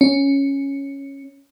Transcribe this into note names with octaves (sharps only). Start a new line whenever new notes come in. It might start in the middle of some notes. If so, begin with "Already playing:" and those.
C#4